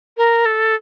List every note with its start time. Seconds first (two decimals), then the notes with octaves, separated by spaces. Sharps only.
0.17 A#4
0.45 A4